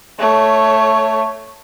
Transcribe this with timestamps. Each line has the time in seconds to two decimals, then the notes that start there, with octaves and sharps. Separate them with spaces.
0.19 A3 C#5